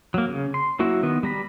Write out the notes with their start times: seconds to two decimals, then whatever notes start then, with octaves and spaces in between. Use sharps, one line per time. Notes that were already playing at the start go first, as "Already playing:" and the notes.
0.14 F#3 A#3
0.29 C#3
0.54 C6
0.79 F#3 A#3 E4 F#4
1.03 D#3 B3
1.23 G3 A#5 B5